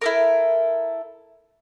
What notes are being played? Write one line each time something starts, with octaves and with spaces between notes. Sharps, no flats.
E4 A4 A#4